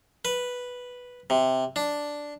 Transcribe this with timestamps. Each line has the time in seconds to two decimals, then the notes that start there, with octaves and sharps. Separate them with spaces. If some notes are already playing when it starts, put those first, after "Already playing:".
0.25 B4
1.30 C3
1.76 D4